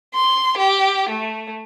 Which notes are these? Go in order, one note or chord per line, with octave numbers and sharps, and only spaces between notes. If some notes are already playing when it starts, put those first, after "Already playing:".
C6
G4
A3